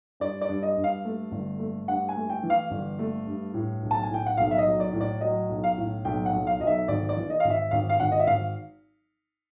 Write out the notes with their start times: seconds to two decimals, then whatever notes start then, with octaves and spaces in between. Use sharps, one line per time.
0.20 G2 D5
0.41 D5
0.49 G2
0.63 D#5
0.77 G2
0.84 F5
1.05 A3
1.31 G1
1.59 A3
1.88 G2 F#5
2.09 G#5
2.16 A3
2.30 G5
2.43 E3
2.50 F5
2.71 G1
2.99 A3
3.27 G2
3.54 A2
3.83 B1
3.91 A5
4.03 G#5
4.10 A2 G5
4.26 F#5
4.37 B1 F5
4.51 E5
4.58 D#5
4.66 F#3
4.80 D5
4.93 A2
5.01 D5
5.21 F#3 D#5
5.49 B1
5.64 F5
5.78 A2
6.05 B1 G5
6.26 F#5
6.33 B1
6.47 F5
6.60 B1 D#5
6.67 E5
6.88 G#1 D5
7.09 D5
7.16 E3
7.30 D#5
7.40 G#1 F5
7.50 E5
7.71 G#1 F5
7.89 F5
8.00 G#1 F#5
8.12 D#5
8.19 E5
8.27 G#1 F5